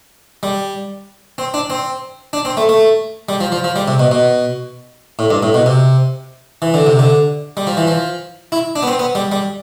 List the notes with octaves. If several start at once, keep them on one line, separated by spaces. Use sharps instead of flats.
G3
C4
D4
C4
D4
C4
A3
A3
G3
F3
F3
F3
G3
C3
B2
B2
A2
G2
A2
B2
C3
E3
D3
C3
D3
G3
F3
E3
F3
E4
D4
B3
C4
B3
G3
G3